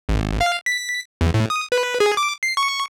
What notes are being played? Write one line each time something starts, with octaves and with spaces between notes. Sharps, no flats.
G#1
F5
B6
E2
A2
D#6
B4
G#4
D6
C7
C#6